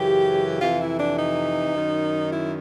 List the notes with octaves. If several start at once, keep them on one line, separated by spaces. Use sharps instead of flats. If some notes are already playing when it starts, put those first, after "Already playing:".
Already playing: F#2 C#3 E3 G4
F2 C3 E3 F4
E4
D4
D#4
F#2 D#3
E4